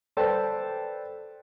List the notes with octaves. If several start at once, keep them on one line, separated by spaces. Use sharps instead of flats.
A4 B4 C5 D5 G5 A5